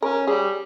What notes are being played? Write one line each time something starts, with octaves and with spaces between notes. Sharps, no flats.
C#4 A#4
G3 G#4